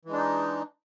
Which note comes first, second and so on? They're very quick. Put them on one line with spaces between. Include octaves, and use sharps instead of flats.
E3 G#3 D4 D#4